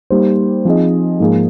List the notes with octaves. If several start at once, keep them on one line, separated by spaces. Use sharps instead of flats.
G3 A#3 D#4 G4 C5
F3 C4 D#4 G#4 D#5
G#2 F3 A#3 F4 G#4